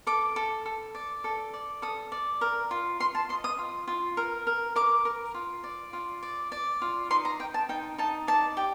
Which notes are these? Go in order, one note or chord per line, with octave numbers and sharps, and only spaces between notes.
A4 D6
A4
A4
D5
A4
D5
A4 D#6
D5
A#4
F4
F4 C6
A5
D#5 C6
D#6
F4
F4
A#4
A#4
A#4 D6
A#4
F4
D5
F4
D5
D5
F4
D#4 C6
A#5
D#4 G5
A5
D#4 G5
D#4 A5
D5 A5
G4